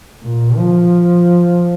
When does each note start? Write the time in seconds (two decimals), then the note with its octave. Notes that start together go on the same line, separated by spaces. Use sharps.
0.23 A#2
0.57 F3